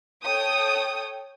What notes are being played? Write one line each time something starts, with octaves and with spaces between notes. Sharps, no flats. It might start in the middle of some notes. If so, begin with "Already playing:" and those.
A4 C#5 G5 D#6